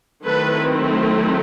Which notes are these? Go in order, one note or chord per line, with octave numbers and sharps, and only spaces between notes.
D#3 F#3 A3 C4 E4 A4 B4